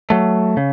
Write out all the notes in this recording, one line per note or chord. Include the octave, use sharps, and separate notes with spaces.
F#3 A3
C#3